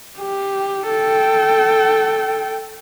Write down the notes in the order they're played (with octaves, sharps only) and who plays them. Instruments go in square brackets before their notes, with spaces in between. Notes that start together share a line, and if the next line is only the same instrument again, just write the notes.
[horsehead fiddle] G4
A4 G5